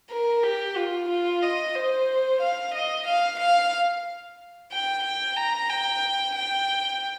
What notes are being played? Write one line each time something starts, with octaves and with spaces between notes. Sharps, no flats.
A#4
G4
F4
F4
D#5
C5
F5
D#5
F5
F5
G5
G5
A#5
G5
G5